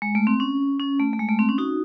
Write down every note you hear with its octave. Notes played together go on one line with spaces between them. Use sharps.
G#3
A3
C4
C#4
C#4
A3
A3
G#3
A3
C4
C#4
D#4 F#4